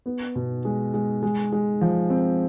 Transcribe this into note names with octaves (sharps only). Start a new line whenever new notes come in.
B3
B2
G#3
G#3
G#3
G#3
F3
C4